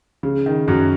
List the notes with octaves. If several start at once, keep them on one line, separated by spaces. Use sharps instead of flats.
C#3
D#3
F#2 F#3